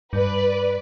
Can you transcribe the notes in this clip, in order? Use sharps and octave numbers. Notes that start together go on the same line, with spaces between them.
G2 B4 D5